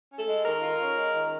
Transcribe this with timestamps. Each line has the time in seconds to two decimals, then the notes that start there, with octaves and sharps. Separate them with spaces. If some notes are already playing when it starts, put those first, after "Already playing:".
0.11 C#4
0.19 A4
0.28 G#3
0.45 D#3 A#4
0.62 F4
0.80 C#4
0.96 G#3
1.14 D#3